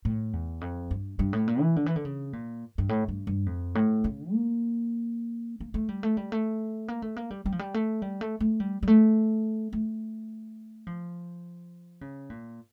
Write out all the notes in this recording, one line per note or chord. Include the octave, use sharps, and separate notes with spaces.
A2
E2
F2
G2
G2
A2
A#2
E3
D3
E3
D3
C#3
A#2
G2
A2
G2
G2
F2
A2
C#3
A#3
A#3
A3
G3
A3
G3
A3
A#3
A3
A#3
G3
G3
F3
G3
A3
G3
A3
A3
G3
G3
A3
A3
F3
C#3
A#2